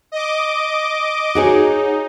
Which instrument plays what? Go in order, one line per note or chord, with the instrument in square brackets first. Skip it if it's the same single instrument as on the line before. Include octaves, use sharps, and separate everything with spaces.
[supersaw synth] D#5 D6
[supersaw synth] D#4 [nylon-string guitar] F#4 G#4 C#5